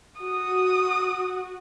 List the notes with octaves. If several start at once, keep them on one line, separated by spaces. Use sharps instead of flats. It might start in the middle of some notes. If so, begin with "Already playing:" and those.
F#4 D#6